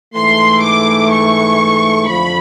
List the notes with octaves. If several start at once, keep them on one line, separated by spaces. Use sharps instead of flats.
G#2 E3 A3 C6
D6
C#6
F2 D3 F3 B5